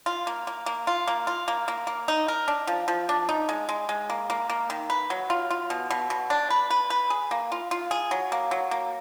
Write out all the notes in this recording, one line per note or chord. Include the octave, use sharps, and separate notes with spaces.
F4
A#3
A#3
A#3
F4
A#3
F4
A#3
A#3
A#3
D#4
A#4
D4
F3
F3
D4
D#4
G#3
G#3
G#3
A#3
A#3
A#3
D#3
B4
F#3
F4
F4
B2
B2
B2
D4
B4
B4
B4
G#4
A#3
F4
F4
G#4
F#3
A#3
F#3
A#3